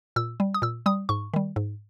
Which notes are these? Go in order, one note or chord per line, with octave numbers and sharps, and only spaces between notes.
A#2 E6
G3
D#6
A#2 E6
G3 D#6
G#2 C#6
D#3 G3
G#2